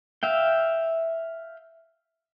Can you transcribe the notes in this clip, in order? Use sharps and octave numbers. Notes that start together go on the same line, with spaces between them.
E5 F5 G5